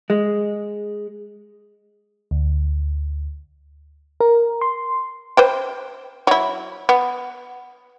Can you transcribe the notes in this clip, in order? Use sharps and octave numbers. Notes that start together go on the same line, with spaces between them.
G#3
D2
A#4
C6
B4 C5 G5
F#3 E4
B3